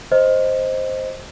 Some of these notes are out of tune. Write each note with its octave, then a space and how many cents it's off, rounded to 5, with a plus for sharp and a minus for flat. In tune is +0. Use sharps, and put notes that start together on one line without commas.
C5 +5 D#5 +0